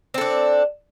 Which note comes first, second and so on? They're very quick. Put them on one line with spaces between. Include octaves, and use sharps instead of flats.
C4 A4 D4